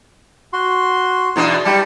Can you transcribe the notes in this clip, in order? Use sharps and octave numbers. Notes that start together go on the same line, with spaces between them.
F#4 C6
E2 B2 D4
G3 G4 A5